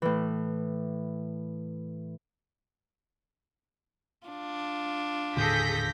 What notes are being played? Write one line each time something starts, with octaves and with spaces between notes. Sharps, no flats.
A2 E3
D4 F4
D#1 A2 D3 G#4 A4 G6 A#6 B6